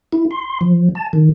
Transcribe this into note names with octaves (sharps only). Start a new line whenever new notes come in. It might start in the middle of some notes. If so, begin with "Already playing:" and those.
E4
C6
F3
A5
D#3